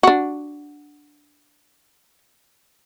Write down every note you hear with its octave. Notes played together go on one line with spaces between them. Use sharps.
D4 F#4